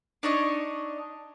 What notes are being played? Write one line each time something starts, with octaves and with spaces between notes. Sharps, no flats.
D4 D#4 C#5 D#5